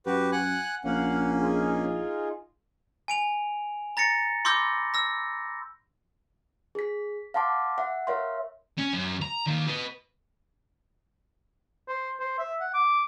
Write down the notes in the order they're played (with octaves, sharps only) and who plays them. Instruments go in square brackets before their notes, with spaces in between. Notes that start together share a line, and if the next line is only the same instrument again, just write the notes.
[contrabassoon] F#2 [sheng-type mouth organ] F#4 G4 B4
[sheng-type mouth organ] F#5 G#5 F#6
[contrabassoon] A#1 [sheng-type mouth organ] A#3 C#4 [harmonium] F5 F#5
[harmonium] D#4 F4 G#4
[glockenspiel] G#5 D7 F7
A#5 A6 A#6 C#7
B5 C6 D6 E6 G6 A#6
E6 A#6
[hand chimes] G#4 B6
F5 F#5 A5 C6 D6
E5 F#5
A#4 C#5 E5 F5 C6
[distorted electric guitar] C#4
F#2
A#5
D#3 A#3
B4 D#5
[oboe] C5
C5
E5
F#5
D6